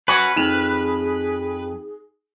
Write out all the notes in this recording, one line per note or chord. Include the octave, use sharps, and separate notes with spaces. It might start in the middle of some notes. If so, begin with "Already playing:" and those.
C#4 F#4 B4
F2 D#4 G#4 E7 F7